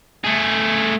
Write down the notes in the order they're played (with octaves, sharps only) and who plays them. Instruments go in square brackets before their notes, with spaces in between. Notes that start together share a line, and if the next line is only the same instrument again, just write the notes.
[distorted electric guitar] A3 G#4